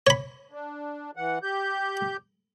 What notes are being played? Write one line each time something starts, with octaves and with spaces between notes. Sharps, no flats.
C#5 B5
D4
E3 F#5
G4 G6